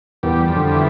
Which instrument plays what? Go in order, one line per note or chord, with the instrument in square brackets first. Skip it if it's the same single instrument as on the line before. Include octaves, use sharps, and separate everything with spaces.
[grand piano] E2 [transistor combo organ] G3
[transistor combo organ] F2
[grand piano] D3
[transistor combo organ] E3